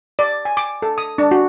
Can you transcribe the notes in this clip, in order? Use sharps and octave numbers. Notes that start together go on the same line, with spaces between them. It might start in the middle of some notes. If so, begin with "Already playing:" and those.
D5
G#5
D6
A4
D#6
D4
F#4